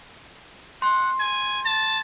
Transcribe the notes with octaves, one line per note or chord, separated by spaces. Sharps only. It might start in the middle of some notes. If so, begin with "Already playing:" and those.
F#5 C6
G#5
A5